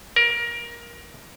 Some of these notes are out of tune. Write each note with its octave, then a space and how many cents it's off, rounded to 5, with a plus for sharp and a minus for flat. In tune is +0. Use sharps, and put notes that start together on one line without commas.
A#4 +20